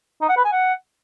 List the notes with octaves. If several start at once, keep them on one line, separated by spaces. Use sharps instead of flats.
D#4
F#5
B4
G#5
F#5